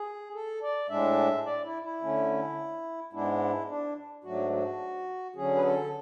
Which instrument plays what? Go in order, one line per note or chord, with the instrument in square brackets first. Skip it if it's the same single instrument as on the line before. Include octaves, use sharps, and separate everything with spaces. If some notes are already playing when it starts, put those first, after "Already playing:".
Already playing: [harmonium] G#4
A4
D5
A2 G#3 D4 E5
D5
E4
E4
D3 A3 C#4
G#2 G#3 B3 D4 E4
D4
G#2 F#3 A3 D4 F#4
F#4
D3 F#3 C#4 G#4
B4
A4